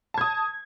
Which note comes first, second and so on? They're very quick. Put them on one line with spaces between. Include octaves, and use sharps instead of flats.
A5 G#6 D#6